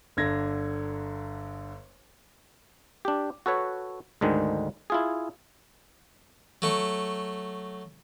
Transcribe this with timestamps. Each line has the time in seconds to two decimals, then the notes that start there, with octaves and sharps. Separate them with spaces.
0.17 G1 D3 G#6 A#6
3.05 D4 G4
3.46 F#4 A4 B4 C#5
4.21 D2 G#2 D3 D#3 G#3
4.90 E4 F4 G#4
6.62 F#3 A3 C#6